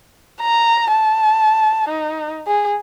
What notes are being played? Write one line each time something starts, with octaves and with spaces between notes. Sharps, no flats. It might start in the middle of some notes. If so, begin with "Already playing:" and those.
A#5
A5
D#4
G#4